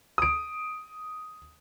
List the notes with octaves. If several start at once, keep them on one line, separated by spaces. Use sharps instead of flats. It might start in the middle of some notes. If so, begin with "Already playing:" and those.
D#6 D7